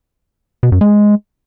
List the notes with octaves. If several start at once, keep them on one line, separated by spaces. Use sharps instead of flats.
B2
F#2
G#3